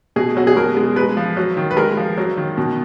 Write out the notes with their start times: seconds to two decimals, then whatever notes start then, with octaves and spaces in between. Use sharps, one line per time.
0.16 B2 G#4
0.37 F#3 F#4
0.47 G#4
0.56 B2 A#4
0.77 G#3
0.96 G#3 B4
1.17 F3
1.37 F#3
1.57 D#3
1.71 B4
1.77 G#3 A#4
1.97 F3
2.18 F#3
2.37 D#3
2.57 B2